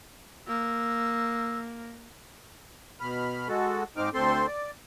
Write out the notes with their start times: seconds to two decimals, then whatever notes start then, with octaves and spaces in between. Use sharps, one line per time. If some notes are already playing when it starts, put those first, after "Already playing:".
0.48 A#3 E6
3.00 B2 B5 F6
3.48 G#3 F#4 A4
3.97 G#2 C4 D#4 D6 F6
4.14 D2 C4 A4 C5 C6
4.47 D5